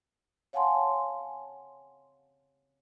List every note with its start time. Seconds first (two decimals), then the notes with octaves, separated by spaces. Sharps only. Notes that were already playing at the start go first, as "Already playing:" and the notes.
0.53 C#5 F5 F#5 G#5 A5 C6